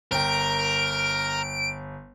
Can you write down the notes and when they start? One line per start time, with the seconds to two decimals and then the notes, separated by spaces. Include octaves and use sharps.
0.11 G1 A#4 G5 D7